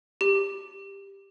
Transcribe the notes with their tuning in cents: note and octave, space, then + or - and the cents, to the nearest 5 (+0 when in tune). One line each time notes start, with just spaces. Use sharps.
G4 +10